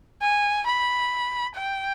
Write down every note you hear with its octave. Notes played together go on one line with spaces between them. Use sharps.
G#5
B5
G5